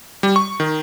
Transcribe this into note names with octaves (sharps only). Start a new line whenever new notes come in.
G3
C#6
D#3